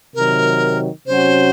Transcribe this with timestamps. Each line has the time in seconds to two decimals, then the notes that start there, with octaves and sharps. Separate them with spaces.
0.15 C3 D#3 F#3 A#4
1.06 C3 F#3 C#4 F#4 C5